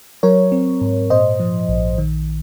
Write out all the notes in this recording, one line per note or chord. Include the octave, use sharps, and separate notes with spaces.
F#3 A#4 C#5
C4
G#2
A#2 C5 D#5
F3
A#1
D#3